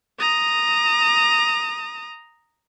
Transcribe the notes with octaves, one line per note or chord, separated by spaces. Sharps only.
A#5 D#6